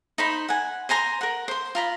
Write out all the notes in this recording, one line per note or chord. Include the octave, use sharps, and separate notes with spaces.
D#4 C5 B5
F#5 G#5
C5 G#5 A#5 C6
A#4 F#5
C5 C6
F4 A#5 B5